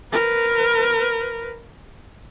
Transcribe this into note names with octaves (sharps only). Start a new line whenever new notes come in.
A#4 B4